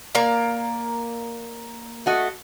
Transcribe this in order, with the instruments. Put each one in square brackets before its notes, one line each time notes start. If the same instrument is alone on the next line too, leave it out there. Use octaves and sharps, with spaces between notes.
[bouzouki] A#3 D5 A#5
[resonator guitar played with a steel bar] A3 F#4 D#5